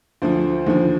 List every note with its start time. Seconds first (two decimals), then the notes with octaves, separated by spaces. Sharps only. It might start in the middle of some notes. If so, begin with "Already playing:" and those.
0.22 D2 D3 F3 C5
0.67 D#2 D3 F3